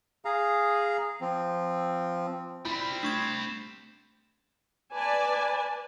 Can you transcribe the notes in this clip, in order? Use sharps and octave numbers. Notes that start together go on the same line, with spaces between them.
G#4 F5 A#5
F3 C4
G3 C4 E4 F4 B5
A3 D4 C#6 G#6
B4 D5 G#5 A5